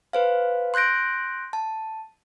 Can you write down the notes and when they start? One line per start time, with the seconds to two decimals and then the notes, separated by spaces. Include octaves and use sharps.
0.13 B4 C5 F5
0.74 C6 F#6 G6 A#6 D7
1.53 A5